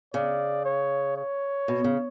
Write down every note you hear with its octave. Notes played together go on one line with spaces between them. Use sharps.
C#3 D5
C#5
C#5
B2
C#3